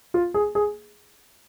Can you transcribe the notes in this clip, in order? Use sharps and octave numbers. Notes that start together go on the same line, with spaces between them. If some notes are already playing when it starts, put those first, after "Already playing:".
F4
G#4
G#4